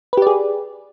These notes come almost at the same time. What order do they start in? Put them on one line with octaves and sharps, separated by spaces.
B4 G4 D5 G#4